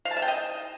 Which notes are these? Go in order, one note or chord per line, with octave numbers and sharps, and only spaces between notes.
F5
A5
E5
G5
D#5